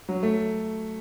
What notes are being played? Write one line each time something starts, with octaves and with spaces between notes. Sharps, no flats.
F#3
A3